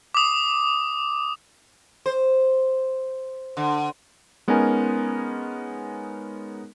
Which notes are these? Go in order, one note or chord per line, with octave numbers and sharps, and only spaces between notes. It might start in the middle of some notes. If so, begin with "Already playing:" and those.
D6 D#6
C5
D3
G#3 B3 C#4 D#4 A#4 G#5